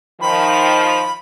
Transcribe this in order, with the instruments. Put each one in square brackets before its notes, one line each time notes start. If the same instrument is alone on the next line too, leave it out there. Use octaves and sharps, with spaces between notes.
[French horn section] D#3 F3 [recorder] B5